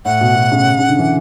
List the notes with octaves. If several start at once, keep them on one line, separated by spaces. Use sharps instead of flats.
A2 F#5
B2
B2
C#3
C#3
D3
E3